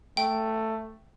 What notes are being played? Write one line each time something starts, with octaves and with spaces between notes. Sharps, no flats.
A3 G5